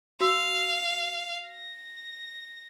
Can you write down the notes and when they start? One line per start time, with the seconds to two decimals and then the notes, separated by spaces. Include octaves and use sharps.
0.20 F#4 F5 E6
1.48 A#6